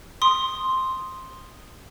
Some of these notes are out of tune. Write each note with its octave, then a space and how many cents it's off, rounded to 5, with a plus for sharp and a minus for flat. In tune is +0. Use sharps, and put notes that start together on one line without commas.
C6 +0 D#6 -5